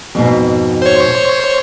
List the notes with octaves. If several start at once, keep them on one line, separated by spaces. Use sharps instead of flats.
F2 G#2 B2
C5 C#5